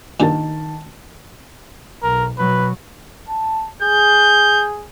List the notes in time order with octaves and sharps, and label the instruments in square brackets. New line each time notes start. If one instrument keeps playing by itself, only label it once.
[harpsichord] G2 A#2 [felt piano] D#3 A5
[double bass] B1 [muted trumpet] A#4
[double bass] B2 F#3 [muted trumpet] B4
[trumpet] A5
[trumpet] G#4 [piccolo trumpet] G6